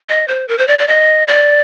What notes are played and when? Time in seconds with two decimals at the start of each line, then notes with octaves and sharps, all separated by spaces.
0.09 D#5
0.28 C5
0.48 A#4
0.58 C5
0.68 D5
0.79 D5
0.88 D#5
1.28 D5